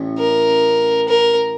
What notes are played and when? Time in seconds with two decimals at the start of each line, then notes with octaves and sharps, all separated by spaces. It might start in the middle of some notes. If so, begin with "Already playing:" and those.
Already playing: A1 A2 C#4
0.18 A#4
1.09 A#4